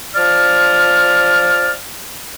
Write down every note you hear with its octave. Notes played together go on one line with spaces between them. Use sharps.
F3 D5 F6